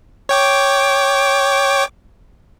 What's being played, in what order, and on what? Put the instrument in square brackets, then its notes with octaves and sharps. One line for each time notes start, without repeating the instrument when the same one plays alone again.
[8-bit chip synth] C#5 G5 D6